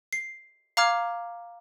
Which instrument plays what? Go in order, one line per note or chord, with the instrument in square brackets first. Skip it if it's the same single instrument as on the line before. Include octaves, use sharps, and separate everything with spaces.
[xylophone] C7
F5 A#5 D6 F6 G#6